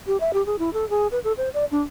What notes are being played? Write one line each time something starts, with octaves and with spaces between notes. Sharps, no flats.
G4
E5
G4
G#4
E4
A4
G#4
B4
A4
C5
D5
D4